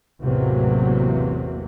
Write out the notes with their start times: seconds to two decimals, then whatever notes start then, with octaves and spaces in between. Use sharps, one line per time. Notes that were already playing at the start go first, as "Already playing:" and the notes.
0.22 A1 E2 C3 F#3 A#3